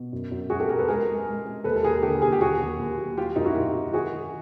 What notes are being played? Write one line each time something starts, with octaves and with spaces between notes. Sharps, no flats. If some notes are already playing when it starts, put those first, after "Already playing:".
Already playing: B2
F#2
F#2
F#2 F#4 G#4
G4 A4
F#3 G#4 A#4
A4 B4
G#3 G#4 A#4
G#3
G#3
G#3
D#2 A4 B4
A4
D#2 G#4 A#4
D3 G4 A4
D#2 G#4
G4
F#3 F#4 G#4
D#2
D#2
F#3
F#3 F4 G4
F#2 D#4 F4
E4 F#4
F#2 F4 G4
F#3
D#3 F#4 G#4
D#3